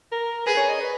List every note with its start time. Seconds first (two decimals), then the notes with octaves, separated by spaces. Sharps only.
0.12 A#4
0.46 G#4 B4
0.57 C#5
0.69 D#5
0.80 B4